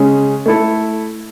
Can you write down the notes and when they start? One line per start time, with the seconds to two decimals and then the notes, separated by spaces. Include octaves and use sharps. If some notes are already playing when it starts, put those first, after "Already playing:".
Already playing: C#3 G#3 C#4
0.46 A3 E4 A4